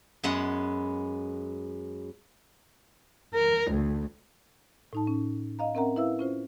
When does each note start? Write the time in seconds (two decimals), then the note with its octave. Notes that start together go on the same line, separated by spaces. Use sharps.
0.24 F#2 G#3 B3 F#5
3.34 A#4
3.71 D2
4.93 A2 D#4 A5
5.07 C#4
5.59 D#5 F5 A#5
5.75 C4 C#4 A#4 E5 F#5 A#5
5.96 E4 B4 E5 F5 E6
6.19 C#4 F4 C5